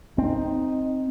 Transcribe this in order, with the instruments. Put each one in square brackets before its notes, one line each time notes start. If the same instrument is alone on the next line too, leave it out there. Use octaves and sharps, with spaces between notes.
[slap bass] C4 [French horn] D#4